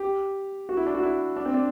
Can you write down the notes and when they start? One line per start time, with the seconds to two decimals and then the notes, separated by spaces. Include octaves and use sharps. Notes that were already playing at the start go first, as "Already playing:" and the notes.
Already playing: G4
0.69 F#4
0.77 E4
0.86 D4
0.94 F#4
1.03 E4
1.37 D4
1.45 C4
1.54 D4